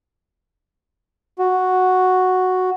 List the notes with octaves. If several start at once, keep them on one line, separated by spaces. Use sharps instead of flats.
F#4